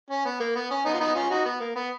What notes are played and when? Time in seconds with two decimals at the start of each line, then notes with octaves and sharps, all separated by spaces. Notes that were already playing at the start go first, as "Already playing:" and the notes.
0.10 C#4
0.26 B3
0.40 A#3
0.55 B3
0.71 C#4
0.85 B3 D#4
0.94 F4
1.00 B3 D#4
1.15 C#4 F4
1.30 D#4 F#4
1.45 B3
1.60 A#3
1.76 B3